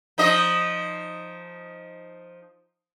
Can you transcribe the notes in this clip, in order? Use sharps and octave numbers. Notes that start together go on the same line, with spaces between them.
F3 D#4 D#5